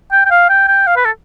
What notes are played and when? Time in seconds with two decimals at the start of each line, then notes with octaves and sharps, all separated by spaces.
0.12 G5
0.26 G5
0.31 F5
0.49 G5
0.68 G5
0.87 F5
0.96 B4
1.05 A4